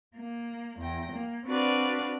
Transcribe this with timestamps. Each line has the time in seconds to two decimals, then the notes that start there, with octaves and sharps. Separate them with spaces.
0.17 A#3
0.79 E2 G5 A#6
1.12 A#3
1.46 C4 D4 F#4 B4 D5 F5